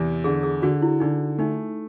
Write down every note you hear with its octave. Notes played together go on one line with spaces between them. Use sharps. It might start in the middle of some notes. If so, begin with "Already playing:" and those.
Already playing: E2 C3
D3 G#4
G#4
D3 F#4
E4
D3 D#4
A3 D#4